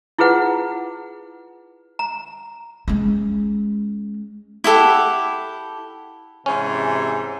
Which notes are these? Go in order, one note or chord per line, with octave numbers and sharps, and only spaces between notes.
E4 F4 G#4 B4 F#5
A#5
G#3 C#4
E4 G4 A4 F#5
G#2 C3 E3 C#4